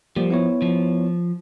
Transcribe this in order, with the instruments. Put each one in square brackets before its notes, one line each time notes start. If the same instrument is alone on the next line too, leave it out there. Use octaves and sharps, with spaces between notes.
[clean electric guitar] F3 [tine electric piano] G3 A#3 G4
[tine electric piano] B3 E4 C#5
[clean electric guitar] F3